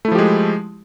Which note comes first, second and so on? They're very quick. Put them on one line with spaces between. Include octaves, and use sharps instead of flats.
A3 E4 F3 G4 G#3